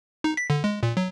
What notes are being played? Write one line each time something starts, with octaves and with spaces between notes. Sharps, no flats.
D#4
B6
D3
G#3
A#2
F#3